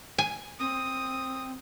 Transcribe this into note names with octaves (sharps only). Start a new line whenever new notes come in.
G#5
C4 D#6